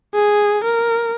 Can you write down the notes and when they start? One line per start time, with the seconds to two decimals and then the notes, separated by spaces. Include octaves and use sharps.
0.14 G#4
0.64 A#4